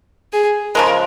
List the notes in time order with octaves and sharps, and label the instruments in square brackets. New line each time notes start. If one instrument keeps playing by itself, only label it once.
[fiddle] G#4
[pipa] C#3 F3 G#3 [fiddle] A#4